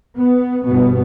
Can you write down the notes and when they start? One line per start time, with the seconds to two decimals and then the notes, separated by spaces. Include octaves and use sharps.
0.15 B3
0.66 G1 B2 B3